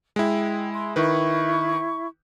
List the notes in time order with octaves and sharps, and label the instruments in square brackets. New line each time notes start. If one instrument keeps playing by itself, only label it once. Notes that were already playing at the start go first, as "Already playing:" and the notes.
[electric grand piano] G#3 E4 [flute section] G5
[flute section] C6
[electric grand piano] D#3 B4 [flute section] E4 C#6